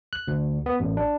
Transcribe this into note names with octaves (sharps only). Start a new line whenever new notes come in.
F#6
D2
B3
A1
D4